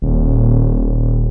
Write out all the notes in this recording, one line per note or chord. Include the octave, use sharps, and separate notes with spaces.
D#1